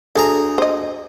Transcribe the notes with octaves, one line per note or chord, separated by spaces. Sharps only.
D2 G#4 A4 A#5
C5 D#5